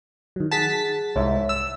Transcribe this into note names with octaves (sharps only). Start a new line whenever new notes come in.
D#3 F#3
G#4 F#5 A5 A6 B6
C2 G#2 C#5 E5
E6